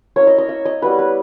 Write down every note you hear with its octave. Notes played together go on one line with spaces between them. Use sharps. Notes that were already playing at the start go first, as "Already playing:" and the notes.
A#3 C#4 E4 C#5
D#5
D#5
E5
D#5
G3 B3 E4 B4
B4